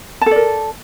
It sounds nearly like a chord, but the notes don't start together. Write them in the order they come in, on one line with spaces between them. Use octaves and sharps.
A5 A4 D5 A#4